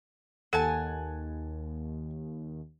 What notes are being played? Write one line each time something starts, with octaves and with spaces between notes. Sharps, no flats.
D#2 A4 F#5 G#5 A5